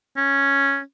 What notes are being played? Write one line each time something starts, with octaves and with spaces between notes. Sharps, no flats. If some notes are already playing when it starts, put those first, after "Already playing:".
C#4